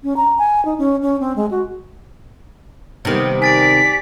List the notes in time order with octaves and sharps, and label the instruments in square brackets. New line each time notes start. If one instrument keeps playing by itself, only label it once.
[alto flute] C#4
A#5
G#5
D#4
C#4
C#4
C4
G#3
F#4
[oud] C3 D#3 [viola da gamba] G3 B3 D#4
[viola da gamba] G4 D5 [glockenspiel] G#5 A6 D7 [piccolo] B6